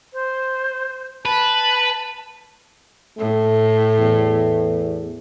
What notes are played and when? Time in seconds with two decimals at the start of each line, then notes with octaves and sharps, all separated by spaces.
0.13 C5
1.25 B4 A5
3.19 A2 A3
3.99 E2